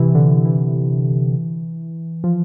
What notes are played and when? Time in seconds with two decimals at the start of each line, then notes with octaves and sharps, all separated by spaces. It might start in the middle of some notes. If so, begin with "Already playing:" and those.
Already playing: C3 E3
0.15 D3
0.45 E3
2.24 F3